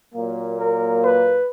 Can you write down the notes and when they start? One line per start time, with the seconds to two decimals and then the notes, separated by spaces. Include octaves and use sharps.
0.14 A#2 F#3 A#3
0.59 A#4
1.04 B4